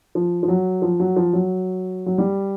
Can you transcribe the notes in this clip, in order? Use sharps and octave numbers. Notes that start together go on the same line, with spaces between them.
F3
F3
F#3
F3
F#3
F3
F#3
F#3
G3